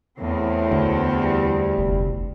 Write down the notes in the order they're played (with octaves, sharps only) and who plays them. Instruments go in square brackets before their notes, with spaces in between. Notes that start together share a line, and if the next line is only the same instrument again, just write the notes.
[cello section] E2 C4 [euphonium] A2
[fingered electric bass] D2
[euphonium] G3
[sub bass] F1